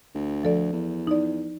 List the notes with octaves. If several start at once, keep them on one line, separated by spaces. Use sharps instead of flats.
D2
F3 A4 D5
E2
D#4 D5